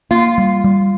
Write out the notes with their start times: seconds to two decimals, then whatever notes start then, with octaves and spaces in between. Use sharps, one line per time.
0.11 A#3 F4
0.38 G3
0.64 G3